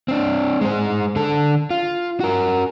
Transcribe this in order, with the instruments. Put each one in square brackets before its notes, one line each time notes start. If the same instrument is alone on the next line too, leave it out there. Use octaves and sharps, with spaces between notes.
[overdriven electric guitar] C4 D4
G#3 C5
D3 A4
F4
F#4 A#4